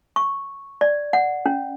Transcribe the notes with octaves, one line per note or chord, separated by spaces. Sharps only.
C#6
D5
F#5
C#4